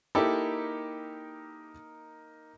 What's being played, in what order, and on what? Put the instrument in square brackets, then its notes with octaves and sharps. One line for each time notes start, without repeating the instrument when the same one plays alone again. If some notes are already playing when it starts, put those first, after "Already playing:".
[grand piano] A#3 D#4 A#4 [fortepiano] E4 G4 A4